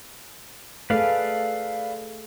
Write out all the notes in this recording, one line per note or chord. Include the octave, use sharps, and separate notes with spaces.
A3 G#4 A4 B4 D5 F5